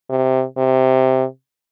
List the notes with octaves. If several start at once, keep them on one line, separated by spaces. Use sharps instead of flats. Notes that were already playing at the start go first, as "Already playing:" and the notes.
C3
C3